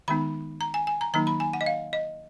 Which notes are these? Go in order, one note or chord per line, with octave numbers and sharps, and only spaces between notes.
D#3 G#3 B3 D#4 B5
A#5
G#5
G#5
A#5
D#3 F#3 A#3 D#4 A#5
B5
G#5
F#5
D#5
F5
D#5